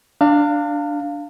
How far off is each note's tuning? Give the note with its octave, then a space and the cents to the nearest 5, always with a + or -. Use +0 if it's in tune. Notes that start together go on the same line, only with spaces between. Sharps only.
D4 +0 F5 +0 A5 +45